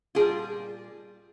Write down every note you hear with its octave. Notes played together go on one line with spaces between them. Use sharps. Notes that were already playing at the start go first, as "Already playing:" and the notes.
A#2 G3 F4 G#4